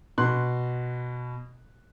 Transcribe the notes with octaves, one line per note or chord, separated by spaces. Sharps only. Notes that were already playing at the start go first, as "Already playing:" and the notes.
B2 C6 F#6